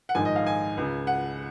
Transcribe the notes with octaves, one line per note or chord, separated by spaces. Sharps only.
F#5
A#1 G#2 D#3 G#5
D#5
F5
G#5
C#2 C#3
F#5